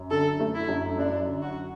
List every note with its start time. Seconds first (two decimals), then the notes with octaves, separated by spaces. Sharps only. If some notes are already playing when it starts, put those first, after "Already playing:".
Already playing: F#2
0.11 D3 A4
0.40 A3
0.55 E4
0.69 F#2
0.98 F#2 D4
1.28 D3
1.42 F#4